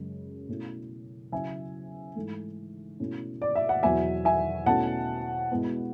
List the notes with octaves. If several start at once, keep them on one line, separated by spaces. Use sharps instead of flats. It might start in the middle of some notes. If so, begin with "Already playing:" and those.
Already playing: F#2 C#3 G#3
B2 A3 C#4 E4
C#3 F#3 C#4 E4 E5 G#5
G#2 E3 A3
B2 A3 C#4 E4
D5
E5
F#5
E2 B2 F#3 B3 E5 G#5
E5 G#5
B2 A3 C#4 E4 F#5 A5
B2 G#3 B3 E4